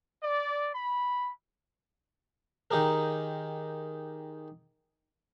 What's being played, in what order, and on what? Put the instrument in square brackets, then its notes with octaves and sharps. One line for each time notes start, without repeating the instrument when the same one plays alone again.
[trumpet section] D5
B5
[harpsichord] D#3 D#4 G4 G#4 A#4